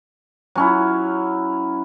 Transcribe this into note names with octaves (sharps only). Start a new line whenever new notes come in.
F#3 C#4 E4